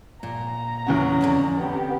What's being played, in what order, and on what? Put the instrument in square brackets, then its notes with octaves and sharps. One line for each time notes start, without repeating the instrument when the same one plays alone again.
[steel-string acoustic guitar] A#2 [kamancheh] A#5
[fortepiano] E2 C#3 F#4 [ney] C#4
[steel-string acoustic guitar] F2 A2 D3
[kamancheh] B3 G4